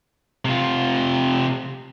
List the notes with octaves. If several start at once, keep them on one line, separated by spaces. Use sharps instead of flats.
C3 F4